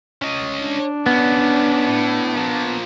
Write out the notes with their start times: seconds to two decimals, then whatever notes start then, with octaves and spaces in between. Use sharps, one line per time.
0.22 C#4 D#5
0.62 D4
1.06 D3 B3 C#4
1.87 A2
2.37 F3 A#3